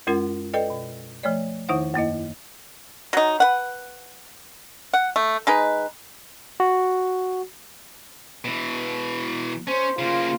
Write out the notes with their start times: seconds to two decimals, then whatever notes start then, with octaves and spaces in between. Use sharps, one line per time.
0.07 F#2 G#3 C#4 F4 A#4
0.54 A4 B4 D5 D#5 G5
0.70 B2
1.23 F3 A3 C#5 D5
1.69 E2 D#3 D#4 E4 C5 F#5
1.94 F#2 A#3 E4 D#5
3.13 F#3 D#4
3.40 B4 F#5
4.93 F#5
5.16 A3
5.47 G#3 D#4 B4
6.60 F#4
8.45 B2 E3
9.67 C#4 C5
9.99 C#3 A#3 F4